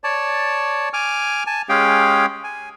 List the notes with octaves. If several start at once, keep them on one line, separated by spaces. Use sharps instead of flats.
C#5 D5 A5
G#5 D6 F6
G#5 A5
G#3 C#4 G4 G#4 F5 G5
G#5